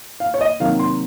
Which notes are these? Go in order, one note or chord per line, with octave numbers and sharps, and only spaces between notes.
F5
C#5
D#5
C3 D#3 F#3 A#3 F5
C6